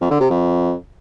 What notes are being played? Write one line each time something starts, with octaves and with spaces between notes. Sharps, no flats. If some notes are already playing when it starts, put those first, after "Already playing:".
F2
D3
C3
F2